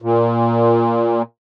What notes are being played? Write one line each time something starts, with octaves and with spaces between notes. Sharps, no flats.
A#2